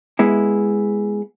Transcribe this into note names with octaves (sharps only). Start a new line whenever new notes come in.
G#3 B3 E4